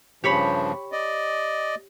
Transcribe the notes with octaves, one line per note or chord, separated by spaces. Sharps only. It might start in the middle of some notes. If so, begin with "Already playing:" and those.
G2 C#3 F3 G4 C#5 B5
D5 D#5